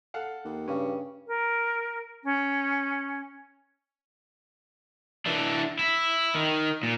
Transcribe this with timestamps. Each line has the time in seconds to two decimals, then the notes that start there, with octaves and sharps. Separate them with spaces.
0.14 A4 F5 F#5
0.45 D#2
0.68 G2 C#3 C#4
1.26 A#4
2.24 C#4
5.26 E3 D4
5.79 E4
6.35 D#3
6.83 A#2